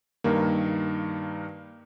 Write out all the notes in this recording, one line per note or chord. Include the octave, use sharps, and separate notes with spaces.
G2 D#3 A#3